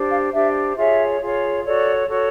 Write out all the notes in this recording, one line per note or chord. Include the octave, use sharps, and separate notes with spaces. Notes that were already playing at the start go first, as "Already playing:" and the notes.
Already playing: D4 G4 C5
F5
D4 G4 C5 E5
F4 G#4 C#5 E5
F4 G#4 C#5
F#4 A4 C#5 D5
F#4 A4 C#5